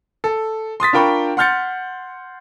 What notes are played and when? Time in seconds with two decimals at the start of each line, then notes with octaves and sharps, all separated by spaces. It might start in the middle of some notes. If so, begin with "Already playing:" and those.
0.24 A4
0.80 C6 D#6 A6 B6
0.93 D4 F4 A#4 G5 B5 C#6
1.37 F#5 C6 F6 G6 A6 C#7